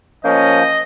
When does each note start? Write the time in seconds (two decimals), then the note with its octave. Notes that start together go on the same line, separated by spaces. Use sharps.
0.25 F3 A#3 C#4 D#5 G6